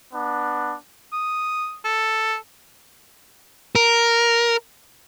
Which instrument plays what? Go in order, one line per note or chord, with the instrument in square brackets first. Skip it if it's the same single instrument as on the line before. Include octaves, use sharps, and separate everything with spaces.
[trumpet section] B3 D4
[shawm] D#6
A4
[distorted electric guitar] A#4